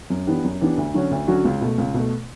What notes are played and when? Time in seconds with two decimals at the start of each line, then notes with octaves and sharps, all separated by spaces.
0.10 F#2
0.27 E3 B3 D4 G4
0.44 F#2
0.61 E3 B3 D4 G4
0.77 D2
0.94 D3 F#3 C#4 F#4
1.11 D2
1.27 D3 F#3 C#4 F#4
1.45 C#2
1.61 B2 A3
1.78 C#2
1.94 B2 A3